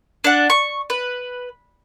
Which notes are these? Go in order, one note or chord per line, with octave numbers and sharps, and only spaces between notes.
D4 F#5
C#6
B4